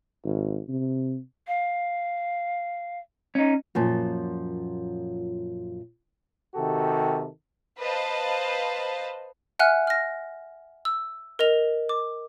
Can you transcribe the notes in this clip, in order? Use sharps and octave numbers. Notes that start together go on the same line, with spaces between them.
G#1
C3
F5
C#4 D#4
F#2 A#2 F3
C3 D#3 F#4 G4 A4
B4 C5 D#5 F5 A5
E5 F#5 G#5 F6 F#6
F6 A#6
E6
A#4 D#5 F7
D6